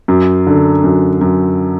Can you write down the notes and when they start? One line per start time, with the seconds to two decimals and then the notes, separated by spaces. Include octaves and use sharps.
0.08 F#2
0.47 D3
0.84 F#2
1.21 F#2